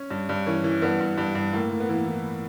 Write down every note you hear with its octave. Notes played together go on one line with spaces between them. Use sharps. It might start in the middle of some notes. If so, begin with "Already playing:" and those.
Already playing: C#4
G2
G2
E3 C#4
E3
G2 B3
G2
G2
G2
A2 A#3
A2
B3
E3 A#3
E3